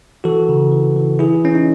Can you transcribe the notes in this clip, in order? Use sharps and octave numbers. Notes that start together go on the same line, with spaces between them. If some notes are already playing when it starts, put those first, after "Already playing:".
E3 F#4 A4
C#3
E3
E3
E3 E4 G#4
E3 C#4
D#4